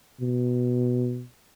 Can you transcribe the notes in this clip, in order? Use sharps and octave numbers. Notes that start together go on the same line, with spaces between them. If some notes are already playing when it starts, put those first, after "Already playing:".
B2